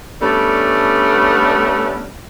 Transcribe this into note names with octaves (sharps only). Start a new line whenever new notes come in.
G3 A3 B3 C#4 D4 A4